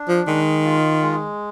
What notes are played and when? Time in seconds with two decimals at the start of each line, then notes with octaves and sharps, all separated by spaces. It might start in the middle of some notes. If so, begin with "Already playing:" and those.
Already playing: D4
0.08 F3
0.26 D#3 G#3
0.65 F4
1.02 G#3